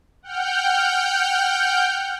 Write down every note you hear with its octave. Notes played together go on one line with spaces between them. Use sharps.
F#5 G5 F6 G6